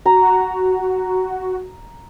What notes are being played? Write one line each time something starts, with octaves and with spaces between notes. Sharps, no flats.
F#4 A#5